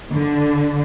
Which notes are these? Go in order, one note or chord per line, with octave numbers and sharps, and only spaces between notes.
D3